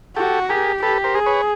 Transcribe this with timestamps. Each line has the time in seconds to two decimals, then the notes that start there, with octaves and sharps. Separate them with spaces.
0.16 F#4 G4 A4
0.49 G4 G#4 A#4
0.83 G4 A4 B4
1.04 A#4 C5
1.15 G#4
1.26 B4 C#5